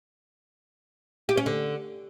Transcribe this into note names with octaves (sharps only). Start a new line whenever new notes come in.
G4
C#4
D3